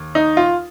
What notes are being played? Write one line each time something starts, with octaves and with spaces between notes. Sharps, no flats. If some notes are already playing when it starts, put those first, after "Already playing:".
Already playing: D#2
D#4
F4